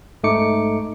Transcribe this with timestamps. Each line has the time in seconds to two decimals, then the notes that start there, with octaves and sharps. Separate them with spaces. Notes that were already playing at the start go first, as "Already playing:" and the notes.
0.23 G#2 A3 D#4 D6 C#7